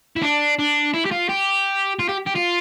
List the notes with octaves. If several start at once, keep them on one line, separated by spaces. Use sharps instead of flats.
E4
D4
D4
E4
G4
F4
G4
F4
G4
G4
F4